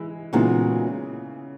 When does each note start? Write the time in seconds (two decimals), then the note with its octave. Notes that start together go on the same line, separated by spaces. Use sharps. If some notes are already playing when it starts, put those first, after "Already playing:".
Already playing: E3 G#3 E4
0.33 A#2 C#3 E3 G#3 B3 D#4 F#4